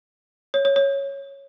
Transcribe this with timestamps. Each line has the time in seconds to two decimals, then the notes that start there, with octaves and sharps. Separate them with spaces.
0.54 C#5
0.65 C#5
0.76 C#5